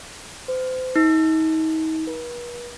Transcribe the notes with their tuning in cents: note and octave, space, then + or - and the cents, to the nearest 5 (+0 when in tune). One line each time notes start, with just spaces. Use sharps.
C5 -35
D#4 +35
B4 -40